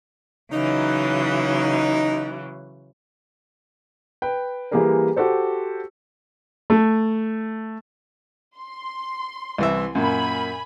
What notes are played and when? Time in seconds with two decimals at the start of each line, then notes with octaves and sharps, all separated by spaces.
0.51 C#3 E3 F#3 D#4
4.22 B4 G5
4.71 E3 G3 A#3 G4 G#4 A#4
5.16 F#4 G4 A4 C5
6.70 A3
8.58 C6
9.58 C2 E3 E5
9.95 F#2 A#2 G#5 B5